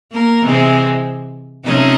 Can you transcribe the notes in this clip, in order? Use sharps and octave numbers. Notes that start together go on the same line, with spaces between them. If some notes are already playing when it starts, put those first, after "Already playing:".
A#3 A#4
C3 E3 G#3 C4
C3 F3 A3 C#4 D#4 D#5